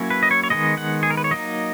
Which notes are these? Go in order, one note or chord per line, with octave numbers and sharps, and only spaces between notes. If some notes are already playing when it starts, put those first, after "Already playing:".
Already playing: F#3 A#3 C#4 E4
B4
D#5
C#5
C#5
D#3 G#3 B3 D#5
F#5
G#4
A#4
B4
C#5
F#3 A#3 D#4 D#5